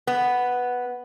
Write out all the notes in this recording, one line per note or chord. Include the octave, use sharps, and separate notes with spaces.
B3